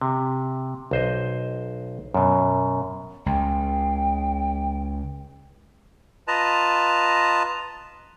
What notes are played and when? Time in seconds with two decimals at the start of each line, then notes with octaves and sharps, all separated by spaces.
0.01 C3
0.91 B1 C5 D#5
2.14 F#2 B2
3.26 C#2 G5
6.28 F4 B4 D#5 A5 A#5